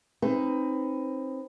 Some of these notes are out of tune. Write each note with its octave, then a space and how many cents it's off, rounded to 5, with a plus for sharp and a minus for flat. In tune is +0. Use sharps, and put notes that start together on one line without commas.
C4 +25 D#4 +0 B4 +20